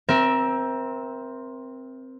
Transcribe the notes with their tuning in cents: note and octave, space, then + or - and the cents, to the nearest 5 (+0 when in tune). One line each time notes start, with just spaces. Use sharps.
C4 +0 A#4 +25 E5 +0